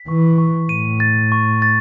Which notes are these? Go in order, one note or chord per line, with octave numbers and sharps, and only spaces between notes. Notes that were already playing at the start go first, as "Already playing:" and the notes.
Already playing: B6
E3 C#6
C#6
A2 D#7
A6
C#6
A6